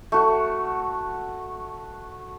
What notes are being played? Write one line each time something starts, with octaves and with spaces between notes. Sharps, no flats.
A3 F#4